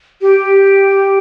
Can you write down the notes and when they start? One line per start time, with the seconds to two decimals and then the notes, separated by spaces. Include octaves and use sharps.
0.21 G4